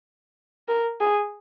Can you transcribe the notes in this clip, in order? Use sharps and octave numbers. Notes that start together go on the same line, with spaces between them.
A#4
G#4